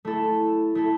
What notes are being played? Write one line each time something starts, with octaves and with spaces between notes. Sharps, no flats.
A3 E4 A4
A3 E4 A4